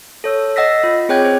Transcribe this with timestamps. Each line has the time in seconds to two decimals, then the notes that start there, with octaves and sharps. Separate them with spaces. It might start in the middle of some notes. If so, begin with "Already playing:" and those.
0.24 A4 C#5 E6
0.56 D#5 F#5 E6 A#6 B6
0.84 F4
1.09 C4 G#4 C#5 G5 F#6 G#6
1.25 G#4 C5